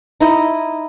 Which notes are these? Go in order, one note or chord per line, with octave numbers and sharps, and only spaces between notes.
D#4 E4 D#5